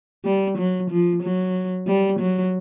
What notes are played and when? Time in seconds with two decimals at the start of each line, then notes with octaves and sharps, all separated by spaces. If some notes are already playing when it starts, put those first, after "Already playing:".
0.25 G3
0.58 F#3
0.91 F3
1.22 F#3
1.87 G3
2.19 F#3